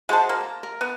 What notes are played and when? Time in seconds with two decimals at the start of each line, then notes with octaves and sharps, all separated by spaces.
0.09 G#3 F#4 G#4 C5 A5
0.29 A#3
0.41 A5 A#5
0.63 A#4
0.81 B3